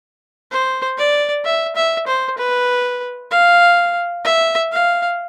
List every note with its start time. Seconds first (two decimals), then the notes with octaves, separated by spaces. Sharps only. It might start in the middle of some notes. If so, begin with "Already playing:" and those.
0.51 C5
0.98 D5
1.45 E5
1.76 E5
2.07 C5
2.37 B4
3.31 F5
4.24 E5
4.72 F5